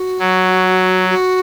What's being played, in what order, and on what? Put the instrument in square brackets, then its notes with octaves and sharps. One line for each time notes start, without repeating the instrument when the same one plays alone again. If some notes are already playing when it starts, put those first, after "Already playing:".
Already playing: [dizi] F#4
[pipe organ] F#3
[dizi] F#4